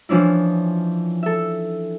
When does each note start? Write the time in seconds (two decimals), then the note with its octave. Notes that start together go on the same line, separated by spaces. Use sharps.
0.09 E3 F3 C#4 D4 E4
1.23 A4 E5